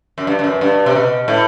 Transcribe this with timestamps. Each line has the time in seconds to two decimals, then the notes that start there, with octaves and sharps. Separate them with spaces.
0.18 F#2
0.27 G2
0.39 G2
0.44 F#2
0.61 G2
0.86 C3
0.95 B2
1.28 A2